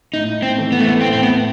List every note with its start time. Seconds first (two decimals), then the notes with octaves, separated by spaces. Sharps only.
0.13 A2 D#4
0.42 C4
0.58 E3 A3
0.72 B3
0.80 A3
0.88 B3
1.01 A2 C4
1.13 C4
1.23 B3